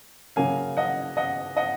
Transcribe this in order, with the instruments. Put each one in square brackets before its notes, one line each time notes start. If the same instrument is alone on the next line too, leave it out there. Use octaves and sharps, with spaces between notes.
[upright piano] C#3 F#3 A#3 F5 G#5
D#5 F#5
D#5 F#5
D#5 F#5